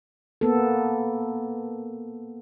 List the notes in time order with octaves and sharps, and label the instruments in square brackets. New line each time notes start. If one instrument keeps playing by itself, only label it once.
[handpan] A#3 B3 A4